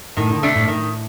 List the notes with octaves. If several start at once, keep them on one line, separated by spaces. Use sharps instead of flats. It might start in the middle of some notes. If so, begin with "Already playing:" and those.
A2 D#3
D3
C3 A3 D4
A2
A2 D#3